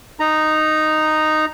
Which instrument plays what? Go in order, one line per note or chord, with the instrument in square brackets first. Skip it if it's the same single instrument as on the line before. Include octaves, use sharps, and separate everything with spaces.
[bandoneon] D#4 A#5